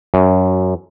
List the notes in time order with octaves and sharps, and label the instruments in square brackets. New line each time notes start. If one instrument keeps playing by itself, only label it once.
[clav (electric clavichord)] F#2